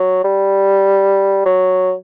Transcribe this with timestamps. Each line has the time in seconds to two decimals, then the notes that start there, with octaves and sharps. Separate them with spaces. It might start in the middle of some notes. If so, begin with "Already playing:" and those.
Already playing: F#3
0.24 G3
1.46 F#3